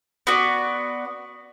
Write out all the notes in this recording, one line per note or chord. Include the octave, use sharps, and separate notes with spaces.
B3 F#4 D5